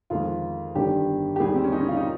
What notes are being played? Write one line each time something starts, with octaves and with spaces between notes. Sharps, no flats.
F2 D#3 G#3 F4
G1 G2 D#3 G4
G4
D#2 D#3 G3 G#4
G4
C4
C#4
D#4
C#4
F4
D#4